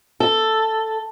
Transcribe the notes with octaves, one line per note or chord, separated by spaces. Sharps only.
A4